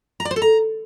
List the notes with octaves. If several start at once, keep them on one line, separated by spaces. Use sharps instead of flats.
A#5
D5
C5
A4
A#5